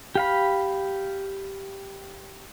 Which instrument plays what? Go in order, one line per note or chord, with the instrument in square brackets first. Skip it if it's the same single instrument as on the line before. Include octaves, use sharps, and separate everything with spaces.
[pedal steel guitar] G4 F5 B5